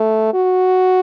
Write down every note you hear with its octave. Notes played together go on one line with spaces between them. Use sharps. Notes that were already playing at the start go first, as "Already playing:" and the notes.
Already playing: A3
F#4